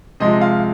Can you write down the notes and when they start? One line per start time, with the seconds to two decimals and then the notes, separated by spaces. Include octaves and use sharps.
0.20 C3 F3 G#3 D#5
0.41 F5